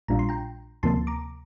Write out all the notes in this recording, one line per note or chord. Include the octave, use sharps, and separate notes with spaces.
A#1 A#2 G3 D4 F4 A#5
C6
G5 A#5
D2 C3 F3 A#3 A5 C6
A#5 D6